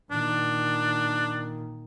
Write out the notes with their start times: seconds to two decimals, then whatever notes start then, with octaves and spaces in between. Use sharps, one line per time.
0.11 A#2 D#3 D4